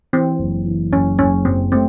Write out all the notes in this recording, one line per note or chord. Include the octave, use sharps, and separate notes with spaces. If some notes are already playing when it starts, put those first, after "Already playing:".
E3 C4
F#1
E3
F#1 C#4
F#1 C#4
F#2 C4
A3 C4